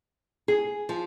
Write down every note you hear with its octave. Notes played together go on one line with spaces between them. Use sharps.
G#4
F3